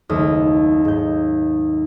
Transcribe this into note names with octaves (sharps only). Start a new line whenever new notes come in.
F#1 D#2 A3 D#6 F6
G#2 G6